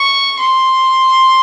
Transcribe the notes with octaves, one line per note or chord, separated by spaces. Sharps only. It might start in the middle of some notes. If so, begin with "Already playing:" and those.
Already playing: C#6
C6